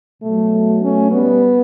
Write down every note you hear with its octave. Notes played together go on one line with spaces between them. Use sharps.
B2 F#3 A3
A3 C#4
G3 B3